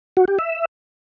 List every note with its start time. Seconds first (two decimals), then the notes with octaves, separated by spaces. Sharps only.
0.17 F#4
0.28 G4
0.39 E5